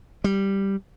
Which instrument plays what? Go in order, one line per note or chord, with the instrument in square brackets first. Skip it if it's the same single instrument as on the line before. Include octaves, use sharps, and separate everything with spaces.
[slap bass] G3